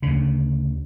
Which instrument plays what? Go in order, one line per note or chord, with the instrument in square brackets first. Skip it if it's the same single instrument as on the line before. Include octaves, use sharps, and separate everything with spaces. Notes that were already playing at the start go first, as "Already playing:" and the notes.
[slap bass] D2 C#3